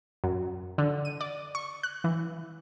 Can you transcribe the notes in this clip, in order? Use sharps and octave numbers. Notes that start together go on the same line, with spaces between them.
F#2
D3
D#7
D5
C#6
F#6
E3